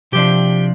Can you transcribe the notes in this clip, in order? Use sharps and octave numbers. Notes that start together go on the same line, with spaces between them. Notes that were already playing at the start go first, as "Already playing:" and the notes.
C3 F3 D4 G4